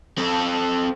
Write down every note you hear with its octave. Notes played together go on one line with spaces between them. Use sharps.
C4 A4